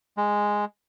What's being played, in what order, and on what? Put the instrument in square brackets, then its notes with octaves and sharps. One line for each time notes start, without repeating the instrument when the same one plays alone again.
[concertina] G#3